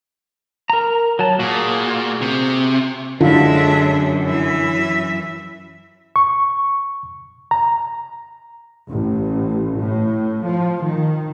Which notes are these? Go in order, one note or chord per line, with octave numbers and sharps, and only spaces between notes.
A#4 A#5
F#3 A5
A#2 F#4 G#4
C3
F#2 D3 F#3 G#3 D4 E4 F4 E5
E3 E5
C#6
A#5
A1
A2
F3
D#3